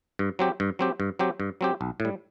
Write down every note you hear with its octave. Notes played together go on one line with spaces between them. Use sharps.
G2
F#3 C4 G4
G2
F#3 C4 G4
G2
F#3 C4 G4
G2
F#3 C4 G4
B1
A2
G3